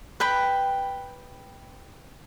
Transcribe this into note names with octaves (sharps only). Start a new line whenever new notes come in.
B4 G5 B5